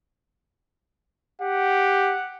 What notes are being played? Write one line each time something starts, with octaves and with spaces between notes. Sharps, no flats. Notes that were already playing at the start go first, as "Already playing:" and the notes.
G4 F#5